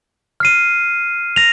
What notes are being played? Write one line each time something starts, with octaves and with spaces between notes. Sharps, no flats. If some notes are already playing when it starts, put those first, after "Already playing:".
F6 C7 D#7
A#6 F7